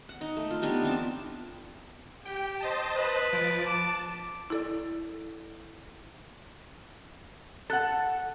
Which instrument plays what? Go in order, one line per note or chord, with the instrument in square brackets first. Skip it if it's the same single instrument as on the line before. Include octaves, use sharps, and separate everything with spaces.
[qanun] F#5
D#4
A3
F4
B3 D4 D#4 G4
E3 C4 A5
[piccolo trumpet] G4 [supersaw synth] G5
[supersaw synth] C5 D#5 A5
[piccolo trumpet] B4
[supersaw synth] F3 A6 D7
[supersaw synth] A5 [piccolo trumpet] D6
[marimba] E4 A4 D5
[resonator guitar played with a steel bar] A4 F#5 [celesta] F#6 A6